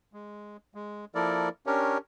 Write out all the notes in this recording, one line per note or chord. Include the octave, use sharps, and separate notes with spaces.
G#3
G#3
F3 A#3 E4 A4 A#4 D5
C#4 D4 G4 A#4 C#5